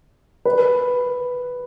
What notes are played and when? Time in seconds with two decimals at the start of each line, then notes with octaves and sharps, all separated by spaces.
0.45 B4